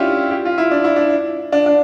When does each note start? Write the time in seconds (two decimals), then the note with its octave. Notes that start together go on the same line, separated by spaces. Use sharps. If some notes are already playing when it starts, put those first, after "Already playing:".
Already playing: C#4 D4 E4 F4 G4
0.31 G4
0.45 F4
0.58 E4
0.71 D4
0.84 E4
0.96 D4
1.52 D4
1.66 D4